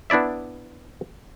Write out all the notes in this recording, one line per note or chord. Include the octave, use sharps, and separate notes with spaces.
B3 D4 E4 D5 E5